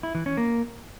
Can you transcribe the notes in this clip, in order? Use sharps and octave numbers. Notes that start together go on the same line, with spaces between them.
E4
E3
C#4
A#3